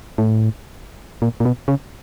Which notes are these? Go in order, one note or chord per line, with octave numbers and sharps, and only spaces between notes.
A2
A#2
A#2
B2
C#3